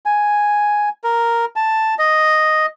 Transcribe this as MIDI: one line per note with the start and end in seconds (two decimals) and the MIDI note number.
0.06 0.89 80
1.04 1.45 70
1.56 1.95 81
1.99 2.66 75